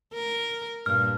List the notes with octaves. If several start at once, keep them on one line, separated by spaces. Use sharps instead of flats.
A#4
G2 A#2 F6